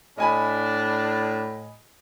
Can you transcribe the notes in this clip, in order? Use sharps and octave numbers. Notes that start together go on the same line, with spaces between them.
A2 D4 D#5 G#5 B5